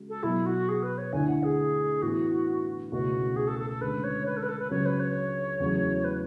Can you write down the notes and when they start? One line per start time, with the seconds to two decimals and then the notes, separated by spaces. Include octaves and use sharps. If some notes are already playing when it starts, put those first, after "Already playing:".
Already playing: C#3 G#3 F#4
0.09 A4
0.23 B2 F#3 B3 E4
0.46 F#4
0.69 G#4
0.83 B4
0.98 C#5
1.13 D2 D3 A3 E4 G#5
1.28 F#5
1.43 G#4
2.02 A2 E3 B3 F#4
2.91 C#2 B2 A3 C#4 F#4
3.36 G#4
3.47 A4
3.59 A4
3.70 A4
3.81 D2 C#3 G#3 B4
4.04 C#5
4.26 B4
4.37 A4
4.43 B4
4.48 A4
4.59 B4
4.70 C#2 C#3 F#3 C#5
4.86 B4
5.00 C#5
5.60 E2 C#3 F#3 A3
6.04 B4